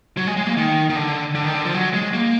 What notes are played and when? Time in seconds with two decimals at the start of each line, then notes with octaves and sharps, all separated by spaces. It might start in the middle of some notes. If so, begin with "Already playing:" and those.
0.17 F#3
0.27 G#3
0.37 G#3
0.46 A#3
0.57 D#3
0.90 D#3
0.96 D3
1.35 D3
1.45 D#3
1.54 D3
1.65 F3
1.75 F#3
1.94 G#3
2.14 A#3